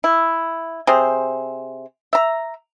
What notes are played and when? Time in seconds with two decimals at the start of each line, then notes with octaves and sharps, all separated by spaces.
0.04 E4
0.87 C3 G#4 C5
2.13 E5 A#5